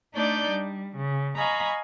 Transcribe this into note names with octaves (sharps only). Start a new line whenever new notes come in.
A3 D4 D#4 D5 G6
G3
C#3
D#5 F5 G#5 A#5 B5 C#6